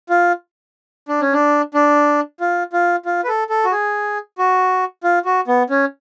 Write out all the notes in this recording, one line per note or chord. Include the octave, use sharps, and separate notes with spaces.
F4
D4
C#4
D4
D4
F4
F4
F4
B4
A4
A4
F#4
G#4
F#4
F4
F#4
B3
C#4